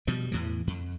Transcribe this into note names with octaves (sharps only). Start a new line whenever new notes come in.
B2 F3 G3
E2 A2 E3
F2